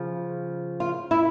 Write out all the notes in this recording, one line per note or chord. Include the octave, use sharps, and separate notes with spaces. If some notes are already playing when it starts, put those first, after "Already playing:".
Already playing: C#3 F3
F4
E4